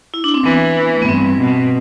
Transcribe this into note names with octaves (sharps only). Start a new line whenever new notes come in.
E4
D4
C4
E3 B3
A3
B3
G2 C4
B2